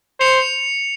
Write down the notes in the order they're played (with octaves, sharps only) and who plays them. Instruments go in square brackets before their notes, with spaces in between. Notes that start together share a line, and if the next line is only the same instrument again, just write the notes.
[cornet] C5 [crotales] C#7 F7